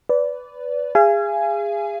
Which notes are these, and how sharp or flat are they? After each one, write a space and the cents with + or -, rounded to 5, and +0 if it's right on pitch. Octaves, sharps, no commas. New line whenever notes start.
B4 +10 D5 -20
G#4 -25 F5 -40 G#5 +0